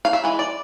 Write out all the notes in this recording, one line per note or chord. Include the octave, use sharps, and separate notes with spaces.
F5
E5
E3 G#3
D5